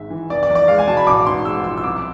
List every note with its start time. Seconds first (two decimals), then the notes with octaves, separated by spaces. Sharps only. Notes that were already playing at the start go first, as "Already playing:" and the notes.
Already playing: G#1 G#2 G#3 E5
0.10 E3
0.30 F1 D5
0.43 D5
0.49 E2
0.55 D5
0.68 G#3 F5
0.79 G#5
0.87 B2 A5
0.97 B5
1.07 A1 D6
1.27 G#2 C6
1.45 G#3 E6
1.64 F3 E6
1.77 E6
1.83 C2 D6